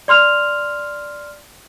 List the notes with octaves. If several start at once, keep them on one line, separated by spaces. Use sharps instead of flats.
D5 C6 F6 F7